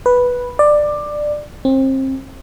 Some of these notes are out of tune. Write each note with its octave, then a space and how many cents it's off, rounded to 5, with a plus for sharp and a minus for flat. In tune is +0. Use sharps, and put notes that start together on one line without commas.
B4 -5
D5 +15
C4 +30